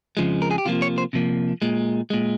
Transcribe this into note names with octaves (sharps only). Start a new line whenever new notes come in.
F2 C#3 F3 G#3
A#4
G#4
G4
C3 F3 A#3 F4
C#5
C5
C3 F3 A#3
A#2 G#3
A#2 G#3